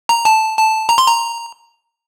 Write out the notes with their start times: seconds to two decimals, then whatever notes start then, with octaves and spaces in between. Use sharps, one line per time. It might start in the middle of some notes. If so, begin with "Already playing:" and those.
0.09 A#5
0.25 A5
0.57 A5
0.89 A#5
0.98 C6
1.07 A#5